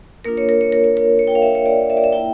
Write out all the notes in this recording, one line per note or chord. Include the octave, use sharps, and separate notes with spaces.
A#3 D4 F4 A#4
C#5
A#4
C#5
A#4
C#5
A#4
C#5
G5
F5
E5
C#5
D5
E5
D5
E5
A#3 E4 G5